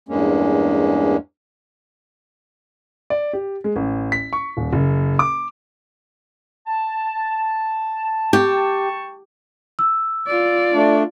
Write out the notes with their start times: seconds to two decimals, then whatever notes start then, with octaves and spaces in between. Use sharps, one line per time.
0.09 E2 G2 G#3 A#3 C#4
3.10 D5
3.33 G4
3.64 G#3
3.76 A1
4.12 B6
4.33 C#6
4.57 D#1
4.72 F#1
5.19 D6
6.67 A5
8.33 G4 G5 A5 C#6
9.79 E6
10.27 F4 D5
10.74 A3 D4